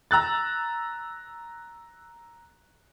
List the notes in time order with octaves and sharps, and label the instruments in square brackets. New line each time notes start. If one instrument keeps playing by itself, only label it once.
[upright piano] A#5 E6 F#6 A6